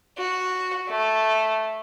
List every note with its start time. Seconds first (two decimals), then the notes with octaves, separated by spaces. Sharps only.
0.18 F#4
0.89 A3